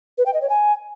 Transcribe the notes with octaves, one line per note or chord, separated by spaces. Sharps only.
B4
G5
D#5
C#5
G#5